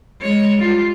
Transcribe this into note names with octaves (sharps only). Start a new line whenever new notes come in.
G#3 C#5
G3 F4